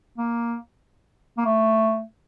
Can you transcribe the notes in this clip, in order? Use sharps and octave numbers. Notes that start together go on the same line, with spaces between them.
A#3
A#3
A3